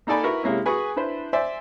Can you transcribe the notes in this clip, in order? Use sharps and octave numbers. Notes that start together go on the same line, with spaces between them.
A#3 D#4 A4 D5 G#5 B5
E4 F#4 A#4 B4
C3 G#3 A#3 C#4 E4
F#4 G#4 B4 G#5
D4 E4 B4 C5
C5 D5 E5 G#5